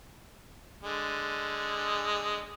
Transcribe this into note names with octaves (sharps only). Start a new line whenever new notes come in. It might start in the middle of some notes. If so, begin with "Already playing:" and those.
D3 G#3